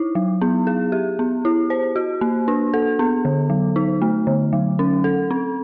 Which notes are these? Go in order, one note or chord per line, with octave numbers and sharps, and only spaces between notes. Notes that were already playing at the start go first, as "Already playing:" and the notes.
Already playing: D#4 E4
F#3
B3
G#4
G4
B3
E4
C5
F#4
A#3
D4
A4
B3
D3
F#3
D#4
A3
D3
F#3
C#4
A4
C4